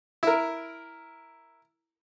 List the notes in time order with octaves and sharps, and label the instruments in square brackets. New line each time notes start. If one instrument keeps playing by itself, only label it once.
[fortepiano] E4 A#4